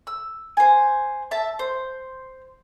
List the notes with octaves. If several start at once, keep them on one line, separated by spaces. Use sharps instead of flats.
E6
C5 G#5
E5 A5
C5